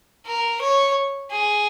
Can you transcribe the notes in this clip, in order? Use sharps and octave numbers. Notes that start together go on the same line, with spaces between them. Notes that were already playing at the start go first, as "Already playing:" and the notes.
A#4
C#5
G#4